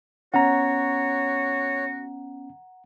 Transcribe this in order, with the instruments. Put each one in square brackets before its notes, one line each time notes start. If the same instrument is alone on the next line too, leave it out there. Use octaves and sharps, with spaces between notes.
[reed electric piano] B3 C#4 [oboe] F#4 [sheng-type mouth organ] C#5 [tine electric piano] F#5 A#5